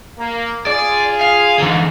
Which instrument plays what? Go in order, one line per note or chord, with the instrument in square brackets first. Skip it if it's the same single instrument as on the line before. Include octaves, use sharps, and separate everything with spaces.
[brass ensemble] A#3
[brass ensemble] F4 G#4 [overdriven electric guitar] D5
[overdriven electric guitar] F5
[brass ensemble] G#2 [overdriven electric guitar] D3 E3